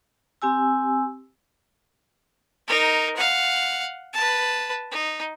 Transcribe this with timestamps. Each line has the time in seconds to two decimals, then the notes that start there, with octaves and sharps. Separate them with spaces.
0.42 C4 G4 G#5 E6
2.68 D#4 A#4
3.17 F5 F#5
4.13 B4 A5
4.91 D#4